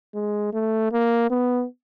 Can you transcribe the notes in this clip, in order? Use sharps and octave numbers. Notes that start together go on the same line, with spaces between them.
G#3
A3
A#3
B3